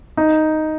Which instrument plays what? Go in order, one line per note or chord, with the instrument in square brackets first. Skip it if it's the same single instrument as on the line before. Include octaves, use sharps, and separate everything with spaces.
[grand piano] D#4